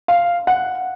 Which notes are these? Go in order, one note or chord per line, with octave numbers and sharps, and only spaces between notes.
F5
F#5